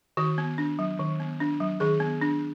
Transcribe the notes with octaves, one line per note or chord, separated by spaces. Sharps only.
D#3 F#4
B3
D4
F#3
D#3
B3
D4
F#3
D#3 G#4
B3
D4